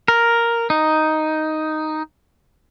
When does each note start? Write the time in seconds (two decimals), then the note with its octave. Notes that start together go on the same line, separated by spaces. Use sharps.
0.08 A#4
0.70 D#4